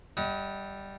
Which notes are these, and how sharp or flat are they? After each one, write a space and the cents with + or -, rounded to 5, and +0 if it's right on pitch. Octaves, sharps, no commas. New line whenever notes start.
G3 +0 D#5 +35 F#5 +0